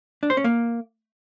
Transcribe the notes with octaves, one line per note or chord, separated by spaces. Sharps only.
D4
C5
C#4
A#3